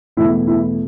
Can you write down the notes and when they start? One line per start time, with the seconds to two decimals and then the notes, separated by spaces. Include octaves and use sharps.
0.17 E2 B2 A3 E4
0.47 E4